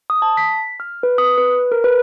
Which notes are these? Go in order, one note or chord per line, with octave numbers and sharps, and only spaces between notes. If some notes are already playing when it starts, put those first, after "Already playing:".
D#6
A5
B6
F6
B4
D#6
B4
A#4
B4